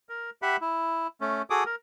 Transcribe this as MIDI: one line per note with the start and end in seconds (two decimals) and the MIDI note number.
0.09 0.30 70
0.42 0.57 67
0.42 0.57 76
0.42 0.57 78
0.42 0.57 83
0.61 1.07 64
1.21 1.42 57
1.21 1.42 61
1.50 1.64 66
1.50 1.64 68
1.50 1.64 69
1.50 1.64 86
1.50 1.64 87
1.66 1.75 70